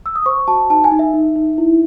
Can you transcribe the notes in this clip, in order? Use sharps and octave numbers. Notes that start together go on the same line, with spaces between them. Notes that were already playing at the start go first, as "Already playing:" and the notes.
E6
D#6
C5 C#6
F#4 A5
D#4 A5
G#5
D#4
E5
D#4
D#4
E4